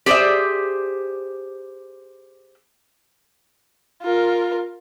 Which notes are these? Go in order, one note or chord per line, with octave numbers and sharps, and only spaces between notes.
G4 G#4 C5 D5 E5
F4 A#4